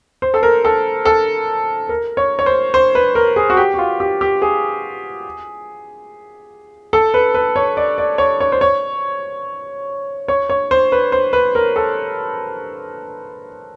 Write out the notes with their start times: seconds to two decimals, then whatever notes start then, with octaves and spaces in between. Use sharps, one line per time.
0.22 C5
0.34 A4
0.43 A#4
0.65 A4
1.05 A4
1.89 A#4
2.17 C#5
2.39 C#5
2.46 C5
2.74 C5
2.95 B4
3.15 A#4
3.36 G#4
3.50 F#4
3.57 G4
3.74 F#4
3.78 F4
4.00 G4
4.21 G4
4.42 G#4
6.93 A4
7.14 B4
7.34 B4
7.56 C#5
7.77 D5
7.98 D5
8.18 C#5
8.40 C#5
8.52 C5
8.61 C#5
10.28 C#5
10.50 C#5
10.71 C5
10.92 B4
11.12 C5
11.33 B4
11.55 A#4
11.76 A4